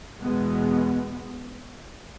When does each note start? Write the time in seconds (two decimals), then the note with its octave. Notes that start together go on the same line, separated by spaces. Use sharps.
0.21 E2 B2 G#3 B3